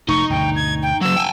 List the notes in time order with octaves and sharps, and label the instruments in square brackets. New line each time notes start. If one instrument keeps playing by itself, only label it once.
[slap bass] F1 A3 [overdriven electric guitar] D#4 [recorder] C#6
[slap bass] D2 G2 B2 [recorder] G5
[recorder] G#6
G5
[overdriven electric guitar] C#3 F#3 [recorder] E6
[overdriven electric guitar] G5 G#5